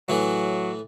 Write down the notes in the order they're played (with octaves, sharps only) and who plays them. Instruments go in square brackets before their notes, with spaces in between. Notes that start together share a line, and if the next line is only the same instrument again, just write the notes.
[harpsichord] A2 E3 [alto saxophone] F#3